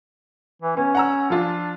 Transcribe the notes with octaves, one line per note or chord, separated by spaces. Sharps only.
E3
B3 C#4
F#5 A#5 E6
F3 D4 F4